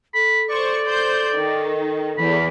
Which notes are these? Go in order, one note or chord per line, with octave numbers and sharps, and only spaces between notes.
A4 B5
C5 D5 C#6
C5 G6
D#3
E2 E3 B5